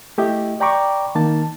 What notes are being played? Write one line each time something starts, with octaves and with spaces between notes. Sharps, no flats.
A3 E4 G4 D#5 E5
D5 G5 A#5 B5 C#6 D6
D#3 A#3 D#4 A5